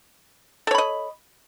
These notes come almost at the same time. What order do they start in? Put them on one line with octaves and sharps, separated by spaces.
A4 C#5 B5 D#5